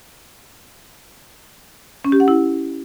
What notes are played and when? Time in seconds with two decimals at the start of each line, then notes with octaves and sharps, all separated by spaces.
2.05 C#4
2.12 G4
2.20 F#5
2.28 E4